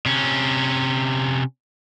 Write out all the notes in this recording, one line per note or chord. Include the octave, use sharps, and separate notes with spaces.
C3 C#4